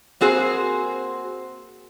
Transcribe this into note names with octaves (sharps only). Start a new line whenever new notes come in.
A#3 C4 F#4 G#4 C5